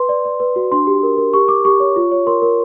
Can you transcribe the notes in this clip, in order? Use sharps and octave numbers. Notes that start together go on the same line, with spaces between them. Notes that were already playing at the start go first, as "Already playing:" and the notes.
Already playing: B4 C6
D5
D5
B4
F#4
D4 C6
G4
A#4
A#4
G4 C#6
G4 D6
G4 C#6
C#5
F4
C#5
A#4 C6
A#4